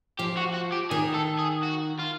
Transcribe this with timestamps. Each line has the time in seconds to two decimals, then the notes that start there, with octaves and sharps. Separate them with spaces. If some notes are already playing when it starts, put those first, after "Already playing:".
0.19 F3 G4
0.37 F#4
0.54 F#4
0.72 G4
0.91 D#3 G#4
1.14 A4
1.39 G#4
1.63 F#4
1.99 F4